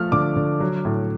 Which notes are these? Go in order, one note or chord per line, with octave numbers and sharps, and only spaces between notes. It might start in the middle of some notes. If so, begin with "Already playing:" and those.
Already playing: F3 A3 F6
D3 D6
D3
F#3
A2